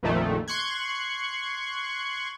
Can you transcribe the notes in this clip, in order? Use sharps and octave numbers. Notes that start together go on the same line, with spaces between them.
A#1 F2 A#2 D#3 A3
C6 C#6 F#6 G#6